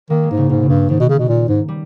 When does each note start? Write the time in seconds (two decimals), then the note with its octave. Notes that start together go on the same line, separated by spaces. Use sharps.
0.10 D#3 A#3
0.24 G#3
0.31 G#2
0.37 C#3
0.50 G#2 B2
0.63 C#3
0.69 G2
0.89 G#2 D#3
1.00 B2
1.09 C#3
1.19 B2
1.29 A#2
1.48 G#2
1.68 G3